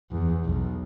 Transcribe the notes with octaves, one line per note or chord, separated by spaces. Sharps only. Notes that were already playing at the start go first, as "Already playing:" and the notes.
E2
B1